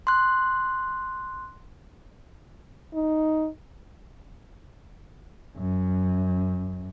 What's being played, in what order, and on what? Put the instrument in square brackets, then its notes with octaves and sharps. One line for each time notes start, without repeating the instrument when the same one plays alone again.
[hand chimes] C6 F#6
[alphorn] D#4
[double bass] F#2